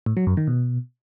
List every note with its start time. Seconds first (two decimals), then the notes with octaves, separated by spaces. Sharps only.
0.06 A2
0.17 F#3
0.27 F#2
0.37 D#3
0.47 B2